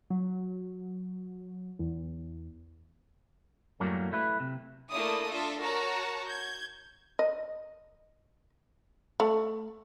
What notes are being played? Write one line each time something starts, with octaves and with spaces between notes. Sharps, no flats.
F#3
E2
F#2 A2 F#3 G3 A#3 C#4
A3 E4 B4
C3
A3 A#3 D4 E4 D5 D#6
D4 F4 A4 E5
F#4 A#4 C#5 A5 A#5
G6 G#6
D#5
A3